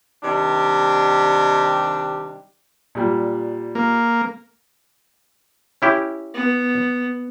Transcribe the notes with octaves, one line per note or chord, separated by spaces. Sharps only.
C3 D#3 G3 D4
A#2 G3
A#3
C#4 E4 G4
B3